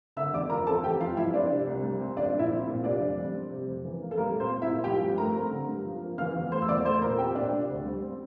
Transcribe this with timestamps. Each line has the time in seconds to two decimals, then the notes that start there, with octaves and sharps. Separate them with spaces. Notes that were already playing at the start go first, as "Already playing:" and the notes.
0.17 D3 E5 E6
0.33 E2 D5 D6
0.50 F3 A#4 A#5
0.67 C4 A4 A5
0.84 E3 G4 G5
1.00 F2 F4 F5
1.17 G3 E4 E5
1.34 C4 D4 D5
1.50 C3
1.67 C2
1.84 G3
2.00 C4
2.17 F3 D4 D5
2.34 A#2
2.39 E4 E5
2.51 C4
2.67 A#2
2.84 C3 D4 D5
3.00 F2
3.18 G3
3.34 C4
3.51 C3
3.67 F2
3.85 E3
4.01 A#3
4.11 A4
4.18 G3 A#3 A#4
4.35 A#2
4.40 C4 C5
4.51 C4
4.62 E4 E5
4.68 A#2
4.84 F3 G4 G5
5.01 G2
5.18 A3 A#4 A#5
5.35 C4
5.51 D3
5.68 G2
5.85 F3
6.02 A#3
6.18 E3 F5 F6
6.36 E2
6.52 A3 C5 C6
6.62 E6
6.68 E2 D5 D6
6.85 A3 C5 C6
7.01 A#2 A#4 A#5
7.18 C4 G4 G5
7.35 A#2 D4 D5
7.51 C3
7.69 D2
7.86 G3
8.02 C4